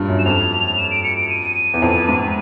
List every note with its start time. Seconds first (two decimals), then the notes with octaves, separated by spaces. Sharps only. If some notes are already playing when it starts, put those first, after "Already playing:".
Already playing: G2 A#2
0.09 F#2
0.19 E7
0.25 F2 F7
0.78 E7
0.91 D7
1.04 C#7
1.17 D7
1.30 D#7
1.74 E2
1.82 F2
2.09 G#2